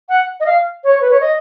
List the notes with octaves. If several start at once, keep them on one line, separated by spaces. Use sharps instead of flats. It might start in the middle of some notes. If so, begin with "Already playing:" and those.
F#5
D#5
F5
C#5
B4
C#5
D#5